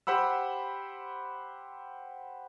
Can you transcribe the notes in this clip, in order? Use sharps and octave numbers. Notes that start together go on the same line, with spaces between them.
G4 C5 F#5 B5 E6